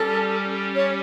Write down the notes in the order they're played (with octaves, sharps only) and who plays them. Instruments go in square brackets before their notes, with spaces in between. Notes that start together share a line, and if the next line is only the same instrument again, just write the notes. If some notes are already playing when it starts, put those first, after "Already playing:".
Already playing: [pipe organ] G3 C#4 G4 [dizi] A4
[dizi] C#5